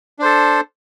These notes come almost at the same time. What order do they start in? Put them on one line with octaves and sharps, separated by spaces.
D4 C5 A4